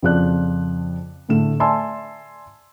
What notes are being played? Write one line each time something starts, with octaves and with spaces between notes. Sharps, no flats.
F2 C#3 F3 D5 F#6
A2 D3 A3 E7
D5 E5 G#5 A5 C6 E6